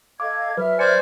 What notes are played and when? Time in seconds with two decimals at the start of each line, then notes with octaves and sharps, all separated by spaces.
0.20 A4 D#5 F5 D6 G#6
0.57 F#3 B4 E5 F6
0.79 C5 D5 G#5 C#7